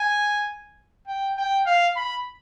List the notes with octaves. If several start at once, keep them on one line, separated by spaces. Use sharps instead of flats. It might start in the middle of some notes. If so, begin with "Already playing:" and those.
Already playing: G#5
G5
G5
F5
B5